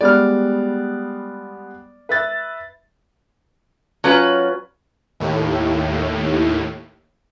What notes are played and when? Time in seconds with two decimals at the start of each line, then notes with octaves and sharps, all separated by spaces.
0.01 G3 G#3 B3 D5 F6
2.09 B4 E5 A6
4.04 F#3 C#4 F4 B4
5.20 D#2 A2